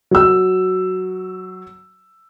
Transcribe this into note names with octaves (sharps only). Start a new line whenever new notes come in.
F#3 E6